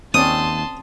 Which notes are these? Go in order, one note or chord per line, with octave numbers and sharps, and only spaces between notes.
D#2 C4 C#4 D5 A5 C6 D#6